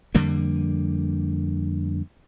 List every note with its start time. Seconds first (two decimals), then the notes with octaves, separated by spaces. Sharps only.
0.15 F2 D3 G3 A#3